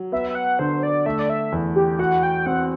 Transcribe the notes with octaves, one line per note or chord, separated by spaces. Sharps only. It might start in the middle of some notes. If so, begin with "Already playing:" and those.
Already playing: F#3
B3 E5
E5
F#5
D3 C5
D5
A3 E5
D5
E5
E2
G4
F#4 F#5
G5
C4 F#5